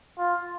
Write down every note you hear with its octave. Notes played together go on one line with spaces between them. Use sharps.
F4